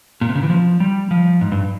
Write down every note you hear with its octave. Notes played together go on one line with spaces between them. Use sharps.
A#2
C3
C#3
E3
F3
G3
F3
G#2
G2